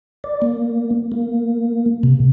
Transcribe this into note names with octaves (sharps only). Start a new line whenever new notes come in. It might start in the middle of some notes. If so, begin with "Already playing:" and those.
D5
A#3
A#3
C3